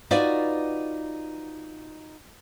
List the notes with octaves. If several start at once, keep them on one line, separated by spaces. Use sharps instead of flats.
D#4 F4 F#4 B4 D5